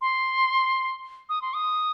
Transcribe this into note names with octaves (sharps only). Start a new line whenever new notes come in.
C6
D#6
C6
D#6